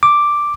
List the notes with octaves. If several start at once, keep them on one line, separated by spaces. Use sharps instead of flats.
D6